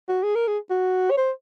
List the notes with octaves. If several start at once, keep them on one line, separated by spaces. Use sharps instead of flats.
F#4
G#4
A#4
G#4
F#4
C#5
C5